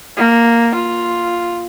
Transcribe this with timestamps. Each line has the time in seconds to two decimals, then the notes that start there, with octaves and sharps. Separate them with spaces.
0.17 A#3
0.74 F4